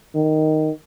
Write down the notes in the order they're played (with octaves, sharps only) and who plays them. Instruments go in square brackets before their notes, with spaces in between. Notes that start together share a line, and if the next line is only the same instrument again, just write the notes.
[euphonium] D#3